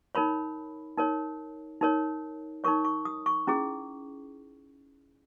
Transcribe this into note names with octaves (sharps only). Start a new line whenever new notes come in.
D#4 A#4 C#5 B5
D#4 A#4 C#5
D#4 A#4 C#5
D#4 A#4 C#5 C#6
C#6
D#6
C#6
C#4 E4 G#4